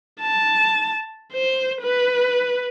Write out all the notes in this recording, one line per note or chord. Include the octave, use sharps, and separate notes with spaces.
A5
C5
B4